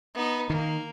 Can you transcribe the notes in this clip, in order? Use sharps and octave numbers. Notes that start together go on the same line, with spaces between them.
B3 D#4
D#3 A#3